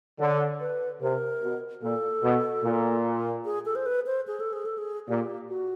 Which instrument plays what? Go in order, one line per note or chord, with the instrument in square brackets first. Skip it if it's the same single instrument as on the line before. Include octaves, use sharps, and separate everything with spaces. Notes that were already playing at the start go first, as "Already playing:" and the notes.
[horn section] D3 [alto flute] C#5
[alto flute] B4
[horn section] C3 [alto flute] A#4
[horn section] B2
[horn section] A#2 [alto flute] A4
[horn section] B2
A#2
[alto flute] G#4
A4
C5
B4
C5
G#4
A4
G#4
A4
G#4
[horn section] A#2 [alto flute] G4
[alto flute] F#4